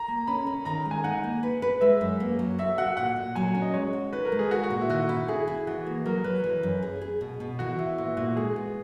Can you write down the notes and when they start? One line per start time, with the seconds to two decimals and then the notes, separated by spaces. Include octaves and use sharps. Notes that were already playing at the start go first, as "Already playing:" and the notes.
Already playing: A#5
0.08 A#3
0.27 C#4 B5
0.47 C#4
0.65 D#3 A#5
0.85 G#3
0.91 G#5
1.04 D#4 F#5
1.24 A#3
1.43 B4
1.62 B4
1.81 G#3 E5
2.01 F#2
2.20 A#3
2.39 F#3
2.59 F#4 E5
2.78 F#4 F#5
2.97 A#2 F#5
3.16 A#2
3.35 F#3 G#5
3.55 C#4
3.62 D#5
3.74 G#3 C#5
3.93 F#4
4.13 D#4 B4
4.25 A#4
4.32 G#3
4.39 G#4
4.51 F#4 A#4
4.64 F#4
4.70 A#2
4.81 E4
4.90 D#3 F#4
5.09 E4
5.28 E4 G#4
5.47 E4
5.67 E3 F#4
5.86 A#3
6.06 F#3 A#4
6.24 F#3 B4
6.44 E3 B4
6.63 F#2
6.83 G#4
7.01 G#4
7.21 B2
7.40 B2
7.59 E3 F#4
7.79 E3 E4
7.98 A#2 E4
8.17 A#2 F#4
8.37 G#3 G#4
8.56 B3